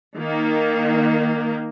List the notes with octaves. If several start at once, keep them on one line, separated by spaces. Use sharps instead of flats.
D#3 A#3